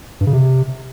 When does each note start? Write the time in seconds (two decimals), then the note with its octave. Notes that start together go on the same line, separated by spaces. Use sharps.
0.21 G2
0.27 C#3
0.33 C3